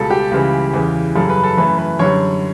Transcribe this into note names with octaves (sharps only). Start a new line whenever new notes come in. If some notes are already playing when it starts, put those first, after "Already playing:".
Already playing: C#2 B2 G3 A4
G4
C#2 C#3 E3 G3
E2 C#3 E3
F#2 C#3 G3 A4
B4
A4
F#2 E3 A3 B4
B4
F#2 D3 G3 C#5